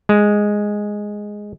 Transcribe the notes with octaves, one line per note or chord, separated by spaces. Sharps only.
G#3